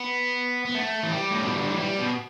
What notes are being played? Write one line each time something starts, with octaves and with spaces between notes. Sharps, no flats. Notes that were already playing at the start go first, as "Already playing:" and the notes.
Already playing: B3
B3
A3
E3
G3
A2
B2
D3
E3
G3
B2